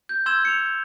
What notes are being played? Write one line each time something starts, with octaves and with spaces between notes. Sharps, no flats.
G6
C6 E6 G6 G#6 E7 G7
C#7 F7